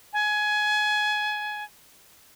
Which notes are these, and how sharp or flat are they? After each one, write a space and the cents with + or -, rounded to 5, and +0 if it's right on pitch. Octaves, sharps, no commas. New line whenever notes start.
G#5 +20